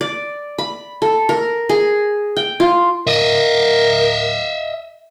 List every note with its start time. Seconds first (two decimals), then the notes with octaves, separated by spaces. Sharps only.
0.01 D5
0.58 B5
1.02 A4
1.29 A#4
1.69 G#4
2.37 G5
2.60 F4
3.07 A#4 D#5 E5